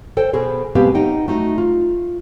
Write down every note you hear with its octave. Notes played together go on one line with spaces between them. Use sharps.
A4 C5 G5
B2 B3 G#4 C5
B2 G#3 B3 C4 G4 F5
D#4 D#5 F#5 G5
A3 D#4 F#4
F4